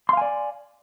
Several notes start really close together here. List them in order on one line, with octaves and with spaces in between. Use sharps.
C6 F5 G#5 D5